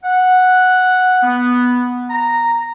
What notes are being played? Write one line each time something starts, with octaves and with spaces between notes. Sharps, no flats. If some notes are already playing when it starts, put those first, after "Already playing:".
F#5
B3
A#5